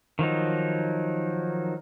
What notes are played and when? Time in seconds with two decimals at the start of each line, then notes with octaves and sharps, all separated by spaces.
0.19 D#3 F3 F#3 D#4